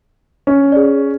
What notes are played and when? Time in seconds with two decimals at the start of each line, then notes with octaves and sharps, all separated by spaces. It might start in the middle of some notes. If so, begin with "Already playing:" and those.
0.47 C#4
0.72 G#4 D5